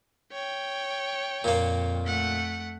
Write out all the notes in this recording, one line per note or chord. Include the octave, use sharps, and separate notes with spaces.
C#5 G5
F2 A#2 A#3
A3 F#5